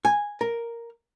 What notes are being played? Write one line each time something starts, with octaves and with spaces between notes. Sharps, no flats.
G#5
A#4